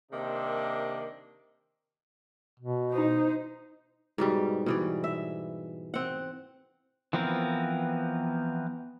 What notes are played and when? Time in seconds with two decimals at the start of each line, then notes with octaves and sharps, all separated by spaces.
0.11 C3 D#3 A#3 D4
2.60 B2
2.92 D#4 C5
4.18 G#2 B2 G3
4.66 B2 E3 D5
5.04 E5
5.94 C4 F#5
7.13 E3 F3 B3 C4 A#4